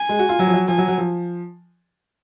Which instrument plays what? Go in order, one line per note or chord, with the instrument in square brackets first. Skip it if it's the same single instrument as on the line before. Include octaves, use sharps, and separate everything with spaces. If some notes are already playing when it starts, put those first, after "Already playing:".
Already playing: [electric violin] G#5
[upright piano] G#3
F#4
F4
F#3
F3
F#3
[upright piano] F3 [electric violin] G#5
[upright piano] F#3
F#3
F3